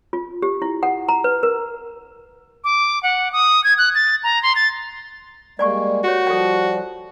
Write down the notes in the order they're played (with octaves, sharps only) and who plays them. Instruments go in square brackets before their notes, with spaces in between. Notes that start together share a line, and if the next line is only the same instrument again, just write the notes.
[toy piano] F4
G4
E4
F#5
A#5
B4
A#4
[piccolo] D6
F#5
D#6
G#6
F#6
A6
A#5
C6
A6
[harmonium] G3 G#3 A#3 [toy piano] D5 G#5 C#6
[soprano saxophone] F#4 [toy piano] G4 C#5
[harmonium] F3 G3 [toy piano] A4 G5